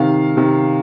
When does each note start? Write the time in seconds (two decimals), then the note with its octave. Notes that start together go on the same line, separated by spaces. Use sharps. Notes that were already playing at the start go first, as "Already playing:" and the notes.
Already playing: C3 D#3 F5
0.37 C3 D#3